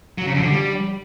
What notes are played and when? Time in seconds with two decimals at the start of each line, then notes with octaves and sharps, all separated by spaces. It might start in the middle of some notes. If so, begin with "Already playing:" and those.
0.18 F#3
0.26 C#3
0.34 F2
0.42 D3
0.50 G3